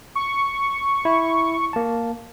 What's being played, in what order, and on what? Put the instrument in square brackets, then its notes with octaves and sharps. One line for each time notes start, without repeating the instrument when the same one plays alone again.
[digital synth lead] C#6
[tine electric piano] E4
A#3 A5